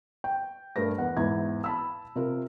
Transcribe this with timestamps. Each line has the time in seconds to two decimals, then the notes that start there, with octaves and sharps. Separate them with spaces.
0.24 G5
0.76 G2 A3 A#4 B4 A#6
0.98 E2 F#5
1.17 E2 G#2 E4 G#6
1.64 A5 B5 E6
2.16 C3 F4 A#4